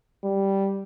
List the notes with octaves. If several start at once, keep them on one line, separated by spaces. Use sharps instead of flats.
G3